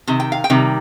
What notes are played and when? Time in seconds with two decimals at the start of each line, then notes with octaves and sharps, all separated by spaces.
0.07 C3 D#3
0.20 G5
0.32 F5
0.44 G5
0.50 C3 D#3 G3